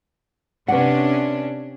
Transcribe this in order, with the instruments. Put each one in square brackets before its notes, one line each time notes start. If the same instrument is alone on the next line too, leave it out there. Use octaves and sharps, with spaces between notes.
[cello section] C3 C#4 D4 [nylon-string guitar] B4 F#5